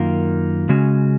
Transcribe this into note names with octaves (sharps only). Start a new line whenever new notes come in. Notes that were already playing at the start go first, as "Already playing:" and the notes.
Already playing: F#2 D#3 A#3 F4
C#3 G#3 C#4 F#4